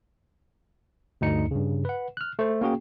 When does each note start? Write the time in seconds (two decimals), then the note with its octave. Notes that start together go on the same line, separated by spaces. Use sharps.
1.21 D2 G2 D#4 C#7
1.51 G2 C#3
1.85 B4 F#5
2.17 F6 F#6
2.39 A3 C5
2.61 A#3 C#4 F#4 G#4 G5